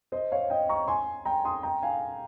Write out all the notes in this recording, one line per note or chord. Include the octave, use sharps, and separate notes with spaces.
C5 D#5
C#5 F5
D#5 G5
A#5 C#6
G#5 C6
G5 A#5
C6 D#6
G5 A#5
F5 G#5